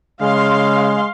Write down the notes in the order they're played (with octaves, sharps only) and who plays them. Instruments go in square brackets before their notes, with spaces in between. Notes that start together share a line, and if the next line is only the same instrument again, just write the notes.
[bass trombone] C#3 [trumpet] G#3 [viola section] F5 C6